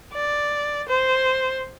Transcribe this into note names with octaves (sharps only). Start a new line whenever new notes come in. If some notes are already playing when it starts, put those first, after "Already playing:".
D5
C5